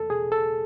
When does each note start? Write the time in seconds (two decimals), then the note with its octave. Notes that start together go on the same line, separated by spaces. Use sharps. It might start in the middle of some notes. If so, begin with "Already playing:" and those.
Already playing: E2 A4
0.10 B2 G#4
0.32 A4